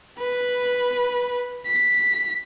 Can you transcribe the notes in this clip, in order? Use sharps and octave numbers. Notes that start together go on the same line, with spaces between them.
B4
B6